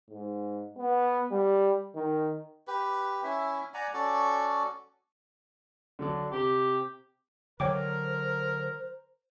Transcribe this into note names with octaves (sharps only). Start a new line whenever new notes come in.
G#2
B3
G3
D#3
G4 B4
C#4 E4 E5
D5 F#5 G#5 A#5
C#4 F#4 A4 D5
D3 F#3 D4
C3 G4
D3 F#3 A#4 C5 C#5 G5 D6